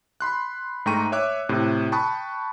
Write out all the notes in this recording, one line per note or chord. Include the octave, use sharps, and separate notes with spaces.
B5 C6 F#6
G#2 A3 G5 A#5 C#6 D#7
C#5 E5 D6 F#6
A2 C3
G5 A5 B5 C#6 D#6 F#6